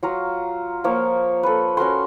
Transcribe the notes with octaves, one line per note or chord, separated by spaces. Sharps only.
F#3 F4 A#5
F3 A#3 C#5
A4 B4
C#4 F#4 A#4 C6